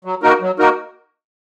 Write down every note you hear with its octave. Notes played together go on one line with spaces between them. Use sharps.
F#3
A#3 D#4 F#4 A#4
F#3
A#3 D#4 F#4 A#4